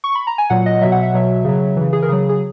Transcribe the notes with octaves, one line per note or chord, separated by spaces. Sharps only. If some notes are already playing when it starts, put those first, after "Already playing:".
C#6
B5
A#5
G#5
A#2 F#3 F#5
D#5
B2 F#3 E5
F#5
E5
B2 F#3
C#3 F#3
C#3 E3
G#4
A#4
C#3 F#3 G#4
G#4